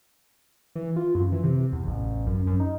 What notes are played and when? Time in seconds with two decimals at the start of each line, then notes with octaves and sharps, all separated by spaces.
0.75 E3
0.96 F4
1.15 F#2
1.32 E3
1.43 C3
1.73 E2
1.87 A1
2.27 F#2
2.47 F#2
2.60 D#4